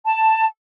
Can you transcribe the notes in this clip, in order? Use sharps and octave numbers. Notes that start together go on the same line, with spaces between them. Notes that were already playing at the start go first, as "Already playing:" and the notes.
A5